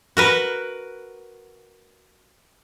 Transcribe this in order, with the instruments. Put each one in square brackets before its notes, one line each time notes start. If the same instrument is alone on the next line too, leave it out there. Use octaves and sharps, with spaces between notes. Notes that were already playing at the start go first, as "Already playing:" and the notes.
[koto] F#4 A#4 B4